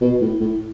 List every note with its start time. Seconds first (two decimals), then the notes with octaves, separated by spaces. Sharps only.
0.01 B2
0.21 A2
0.41 A2